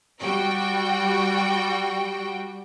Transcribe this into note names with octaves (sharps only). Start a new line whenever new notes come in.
G3 F#4 G5